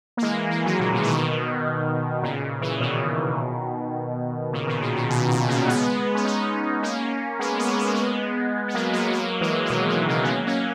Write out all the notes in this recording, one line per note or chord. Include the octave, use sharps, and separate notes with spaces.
A#3
E3 G#3
E3 G#3
D#3 F#3
A#2 C#3
B2 D#3
E3
B2 D#3
A#2 C#3
C#3 E3
B2 D#3
A#2 C#3
B2 D#3
A#2 C#3
B2
B2
B2
A#2 C#3
G#3 B3
C#4
B3 D#4
A#3 C#4
G#3 B3
G#3 B3
B3
A#3
G#3 B3
B3
F#3 A#3
F#3 A#3
F#3 A#3
E3 G#3
E3
B2 D#3
B2 D#3
C#3 E3
B3
F#3 A#3
A#3 C#4